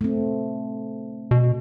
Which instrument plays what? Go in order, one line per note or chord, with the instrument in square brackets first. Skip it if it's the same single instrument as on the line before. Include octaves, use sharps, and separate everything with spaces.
[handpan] A3 C4
[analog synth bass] B2